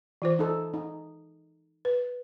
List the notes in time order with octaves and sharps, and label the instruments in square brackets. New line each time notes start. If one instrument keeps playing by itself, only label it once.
[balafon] E3 F4 C5
[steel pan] D#4 A4
D#4
[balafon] B4